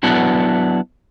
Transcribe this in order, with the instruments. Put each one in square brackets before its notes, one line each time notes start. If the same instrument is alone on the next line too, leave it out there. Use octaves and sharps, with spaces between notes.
[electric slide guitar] F#3 B3 D4 E4 F#4